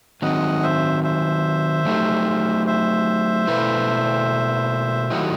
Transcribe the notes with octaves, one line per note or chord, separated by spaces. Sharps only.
D#3 F#3 C4 D#4 D#5 F#5
C5 E5
C5 E5
F#3 A3 D#4 G4
C5 E5
B2 A3 E4 B4
D#3 F#3 A3 E4 G4 D#5 F#5